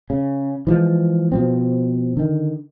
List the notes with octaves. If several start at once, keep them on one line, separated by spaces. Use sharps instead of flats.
C#3
E3 F3 G#3
B2 F3 C4
D3 D#3